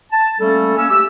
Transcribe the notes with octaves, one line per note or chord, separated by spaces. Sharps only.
A5
G3 A3 A#3 C#4 A4
A#3 C#4 G#5 E6
A3 G4 D6 E6